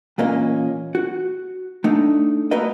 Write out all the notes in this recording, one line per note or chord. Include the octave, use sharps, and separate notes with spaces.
E2 A#2 A#3 C#4 D#5
F#4
A3 D4 D#4
A3 A#3 F#4 A#4 B4 D#5